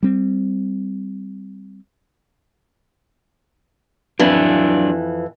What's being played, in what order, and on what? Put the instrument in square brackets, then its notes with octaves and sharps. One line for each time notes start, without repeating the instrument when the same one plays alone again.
[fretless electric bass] G3 C4
[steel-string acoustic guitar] F2 E3 [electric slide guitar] F#3 D4